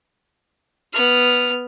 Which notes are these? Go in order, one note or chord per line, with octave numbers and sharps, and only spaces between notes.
B3 F6